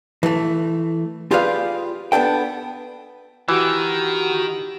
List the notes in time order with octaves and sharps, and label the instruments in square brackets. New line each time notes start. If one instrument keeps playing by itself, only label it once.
[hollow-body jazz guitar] E3 A3
F4 G4 G#4 B4 D5 F5
B3 D4 A4 G5
[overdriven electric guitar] D#3 [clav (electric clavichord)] E3 [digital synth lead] F#4 [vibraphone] G4